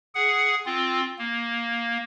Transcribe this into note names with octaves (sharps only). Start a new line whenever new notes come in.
G#4 F#5
C4 F4
A#3